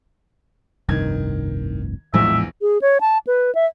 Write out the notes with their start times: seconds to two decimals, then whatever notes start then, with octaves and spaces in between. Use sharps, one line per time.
0.89 F1 C2 G2 D#3 G#6
2.14 A#1 E2 A2 F3 G#3 E5
2.61 G#4
2.82 C#5
3.01 A5
3.27 B4
3.55 E5